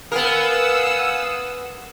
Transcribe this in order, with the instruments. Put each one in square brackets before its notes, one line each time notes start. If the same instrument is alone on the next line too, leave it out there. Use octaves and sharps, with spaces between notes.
[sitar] B3 A#4 [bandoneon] F5 G#5 D#6 [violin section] F#5 E6